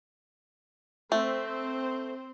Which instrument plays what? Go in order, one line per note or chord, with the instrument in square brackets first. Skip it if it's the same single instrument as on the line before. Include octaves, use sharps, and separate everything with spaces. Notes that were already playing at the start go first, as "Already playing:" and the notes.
[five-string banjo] A3 [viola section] C4 C5